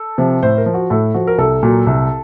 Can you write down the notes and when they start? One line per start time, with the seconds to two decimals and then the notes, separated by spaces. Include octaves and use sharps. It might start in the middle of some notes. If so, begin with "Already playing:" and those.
Already playing: A4
0.18 C3 F3
0.43 A2 C5
0.58 A#4
0.66 F3
0.74 F#4
0.90 A2 A4
1.14 F3 F#4
1.27 A#4
1.38 C2 A4
1.63 A#2 F#3
1.87 C2